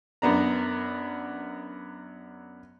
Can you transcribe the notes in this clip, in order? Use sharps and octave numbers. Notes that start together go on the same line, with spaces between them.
F#2 B3 D4 A#5